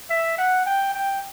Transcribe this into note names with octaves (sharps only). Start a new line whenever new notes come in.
E5
F#5
G5
G5